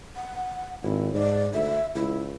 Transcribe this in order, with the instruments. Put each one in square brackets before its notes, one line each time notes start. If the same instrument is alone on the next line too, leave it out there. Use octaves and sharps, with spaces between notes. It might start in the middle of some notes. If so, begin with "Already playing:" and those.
[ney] F#5
[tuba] G#1 [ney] E4
[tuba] G#2 [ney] D5
[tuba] D2 [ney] E5
[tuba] C#2 [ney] E4